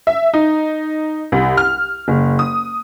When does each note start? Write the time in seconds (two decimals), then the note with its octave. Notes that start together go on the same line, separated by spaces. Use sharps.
0.07 E5
0.34 D#4
1.32 C2
1.57 F6
2.08 F#1
2.39 D#6